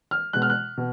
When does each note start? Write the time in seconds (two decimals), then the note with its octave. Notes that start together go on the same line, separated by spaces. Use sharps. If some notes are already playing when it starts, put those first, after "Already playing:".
0.11 F6
0.33 B2 G#3 F#6
0.42 F6
0.50 F#6
0.77 B2